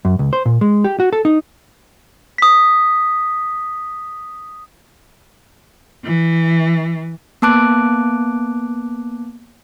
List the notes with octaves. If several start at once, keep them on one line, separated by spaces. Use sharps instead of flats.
F#2
C#2
C5
A#2
G#3
G4
F#4
A4
D#4
D#6 B6
E3
A#3 B3 A5 D6 F#6 D7